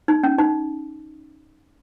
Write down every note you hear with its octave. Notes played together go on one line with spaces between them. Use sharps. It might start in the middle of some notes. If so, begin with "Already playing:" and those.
D#4
C#4
D#4